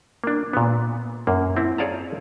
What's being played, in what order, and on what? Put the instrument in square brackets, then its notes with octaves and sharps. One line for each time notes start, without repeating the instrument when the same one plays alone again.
[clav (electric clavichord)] A#3 D4
A#2 B3
F#2 A#3
C4 E4
G#4 C#5 D5 F5 A5 A#5